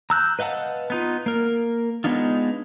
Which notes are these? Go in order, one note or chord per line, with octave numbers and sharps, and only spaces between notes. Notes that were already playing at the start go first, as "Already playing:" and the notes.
A#5 E6 F#6 G6
B4 D#5 F5 F#5 A5
B3 D#4 F4
A#3 A#4
G#3 B3 D4 D#4 F4